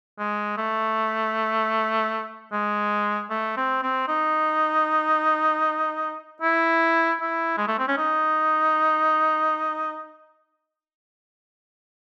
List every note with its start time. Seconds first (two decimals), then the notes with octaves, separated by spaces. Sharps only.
0.19 G#3
0.58 A3
2.52 G#3
3.30 A3
3.57 C4
3.83 C4
4.08 D#4
6.42 E4
7.20 E4
7.58 G#3
7.68 A3
7.78 C4
7.88 C#4
7.98 D#4